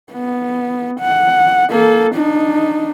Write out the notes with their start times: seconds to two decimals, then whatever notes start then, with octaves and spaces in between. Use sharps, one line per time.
0.12 B3
1.00 F#5
1.70 A#3 A4
2.15 D4 D#4